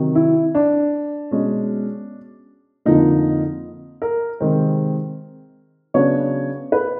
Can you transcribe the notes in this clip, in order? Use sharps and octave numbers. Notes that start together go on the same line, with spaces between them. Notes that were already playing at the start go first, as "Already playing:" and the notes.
Already playing: C3 D#3 F#3
E4
D4
B2 G#3 C#4
F2 D3 F3 A#3 D#4
A#4
C3 D#3 G#3 C4
C#3 F#3 B3 D4 C#5
B4